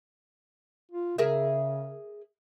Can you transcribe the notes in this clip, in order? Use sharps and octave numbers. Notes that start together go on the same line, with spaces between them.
F4
C#3 G#4 A#4 E5